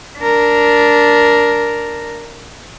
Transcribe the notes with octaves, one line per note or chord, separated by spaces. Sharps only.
D4 A#4